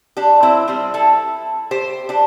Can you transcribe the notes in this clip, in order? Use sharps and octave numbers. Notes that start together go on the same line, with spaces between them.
D4 G4
C4 E4
G3 C4
E4 A4
G4 C5
D4 G4